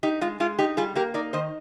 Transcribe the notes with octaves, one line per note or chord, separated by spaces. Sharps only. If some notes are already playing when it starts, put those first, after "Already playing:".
D#4 G4
G#3 F4
G#3 F4
D#4 G4
G3 F4 G#4
A#3 G4 A#4
D#4 A#4 D5
D#3 C5 D#5